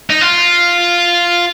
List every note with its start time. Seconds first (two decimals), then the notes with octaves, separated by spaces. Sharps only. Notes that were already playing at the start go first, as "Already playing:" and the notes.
0.10 D#4
0.21 F4